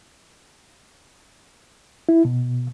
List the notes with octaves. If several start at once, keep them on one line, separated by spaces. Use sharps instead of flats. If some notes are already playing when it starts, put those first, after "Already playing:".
E4
B2